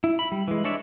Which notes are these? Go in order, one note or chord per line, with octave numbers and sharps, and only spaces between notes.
E4
B5
G3
E3 G#3
G#3 D4 C#5 D5 E5